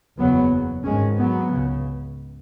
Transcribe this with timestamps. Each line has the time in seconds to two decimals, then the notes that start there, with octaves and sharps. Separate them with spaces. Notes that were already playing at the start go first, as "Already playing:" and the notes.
0.19 F#1 E2 C#3 F#3 B3
0.85 G#1 G#2 G#3 C#4
1.18 F#3 B3
1.51 C#2 C#3